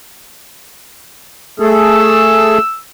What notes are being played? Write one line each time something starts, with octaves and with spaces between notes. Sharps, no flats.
A3 G#4 A4 E6